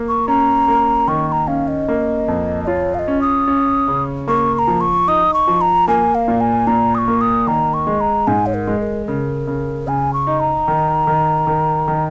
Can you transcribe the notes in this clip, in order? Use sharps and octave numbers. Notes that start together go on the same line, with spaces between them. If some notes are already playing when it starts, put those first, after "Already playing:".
Already playing: A#3
C#6
C#4 A#5
A#3
D#3 C#6
C#6
A#5
C#4 F5
D#5
A#3
F2
D#5
F4 C#5
F5
D#5
C#4
D#6
C#4
C#3
A#3 C#6
C#6
A#5
F3
C#6
D#4 D#6
C#6
F3
A#5
A#3 G#5
F5
A#2
G#5
A#2 A#5
D#6
C#6
A#3
D#6
D#3 A#5
C#6
G#3
A#5
G#2 G#5
C#5
A#4
G#3
A#4
C#3 A#4
C#3
C#3 G#5
C#6
D#4
A#5
D#3
D#3
D#3
D#3